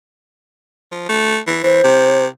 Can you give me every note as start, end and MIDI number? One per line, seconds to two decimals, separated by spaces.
0.92 1.08 53
1.09 1.38 57
1.47 1.62 52
1.63 1.81 52
1.63 2.23 72
1.84 2.27 48